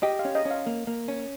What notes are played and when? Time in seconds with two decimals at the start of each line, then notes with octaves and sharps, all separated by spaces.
0.03 G4 D#5
0.19 F5
0.25 C#4
0.35 D#5
0.45 C#4
0.51 F5
0.66 A#3
0.87 A#3
1.08 C#4